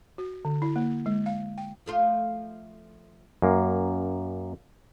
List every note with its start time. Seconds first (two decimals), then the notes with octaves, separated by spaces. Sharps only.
0.18 F#4
0.45 D3
0.62 E4
0.76 A#3
1.06 G#3
1.26 F5
1.58 G5
1.86 F3 A3 F4
3.42 F#2 A#3